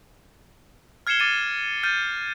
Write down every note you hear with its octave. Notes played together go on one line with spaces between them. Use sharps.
F6 G#6 C7 C#7 E7 G7
D6 A6 D#7
F6 G6 A6 D#7